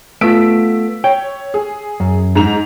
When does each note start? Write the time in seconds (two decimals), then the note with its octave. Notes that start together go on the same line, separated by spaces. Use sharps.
0.21 A3 B3 F4 E6 B6 D7
1.04 C#5 G5
1.54 G#4
2.00 F#2
2.35 G#2 A#5 F7